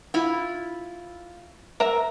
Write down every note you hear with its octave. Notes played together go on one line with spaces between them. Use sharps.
E4 F4
A#4 E5 A#5